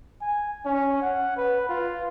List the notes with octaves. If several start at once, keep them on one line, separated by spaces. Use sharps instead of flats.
G#5
C#4
F#5
B4
F4